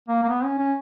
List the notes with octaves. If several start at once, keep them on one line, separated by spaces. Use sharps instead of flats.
A#3
A#3
B3
C#4
C#4